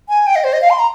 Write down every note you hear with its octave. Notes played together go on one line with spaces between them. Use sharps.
G#5
G5
D#5
C5
D#5
F5
C6
A#5